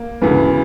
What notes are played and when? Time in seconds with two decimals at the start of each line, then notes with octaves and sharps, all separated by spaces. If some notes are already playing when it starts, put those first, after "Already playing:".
Already playing: A#3
0.21 D2 C#3 E3 B3